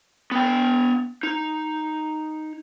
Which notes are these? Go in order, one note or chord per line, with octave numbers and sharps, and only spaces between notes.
B3 G5
D#4